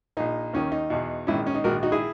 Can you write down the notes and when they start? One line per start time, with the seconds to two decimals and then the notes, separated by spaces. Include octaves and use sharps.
0.17 A#1 A#2 D#4
0.53 D#2 D#3 C#4
0.72 D#4
0.90 E2 B2
1.27 A#1 G#2 D#3 C#4 E4
1.47 C#4
1.55 D#4
1.64 A#1 G#2 D#3 F#4 A#4
1.83 D#4 F#4
1.92 E4 G#4